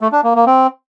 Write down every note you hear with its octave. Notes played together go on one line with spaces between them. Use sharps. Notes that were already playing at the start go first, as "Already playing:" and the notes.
A3
D4
A#3
A#3
C4